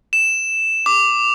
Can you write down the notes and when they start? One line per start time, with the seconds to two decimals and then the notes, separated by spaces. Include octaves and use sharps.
0.13 E7
0.86 D6